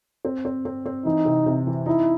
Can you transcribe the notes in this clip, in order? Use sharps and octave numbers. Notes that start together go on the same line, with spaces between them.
C4
C4
C4
C4
E3 D#4
C3
C3
E3
D#4 E4